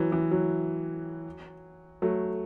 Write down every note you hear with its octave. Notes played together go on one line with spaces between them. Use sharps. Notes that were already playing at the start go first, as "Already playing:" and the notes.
Already playing: E3 F#3
E3
F#3
F#3 A3